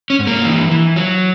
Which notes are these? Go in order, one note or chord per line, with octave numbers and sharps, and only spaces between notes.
C#4
G#2
A#3
E3
E3
F#3